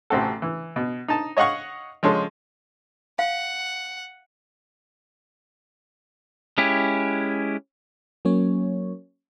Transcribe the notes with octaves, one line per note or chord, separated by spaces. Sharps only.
A1 C3 C4 F#4 A4
E3
B2
D#4 A5
C#5 D#5 F5 F#5 C#6
F3 G#3 C#4 A4
F5 F#5
G#3 C#4 E4 G4
F#3 A#3 C#4 C#5